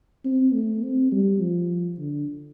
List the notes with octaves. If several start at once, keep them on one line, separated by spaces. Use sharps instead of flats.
C4
A3
C4
G3
F3
D3